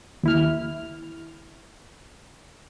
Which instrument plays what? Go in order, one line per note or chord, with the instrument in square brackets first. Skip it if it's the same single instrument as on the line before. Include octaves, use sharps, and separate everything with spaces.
[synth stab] D#2 E4 F6